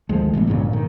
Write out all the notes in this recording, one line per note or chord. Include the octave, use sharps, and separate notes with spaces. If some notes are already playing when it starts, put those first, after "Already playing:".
D2 D#3 F3 G#3
A1 A2 E3 B3
A#1 G2 A#2 C#3
D#3